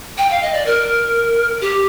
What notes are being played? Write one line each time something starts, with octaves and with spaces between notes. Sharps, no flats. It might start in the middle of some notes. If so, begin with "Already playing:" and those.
G5
F5
D#5
D5
A#4
G4